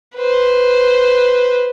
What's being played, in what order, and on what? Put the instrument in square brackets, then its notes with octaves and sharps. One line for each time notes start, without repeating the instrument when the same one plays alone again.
[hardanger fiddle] B4 C5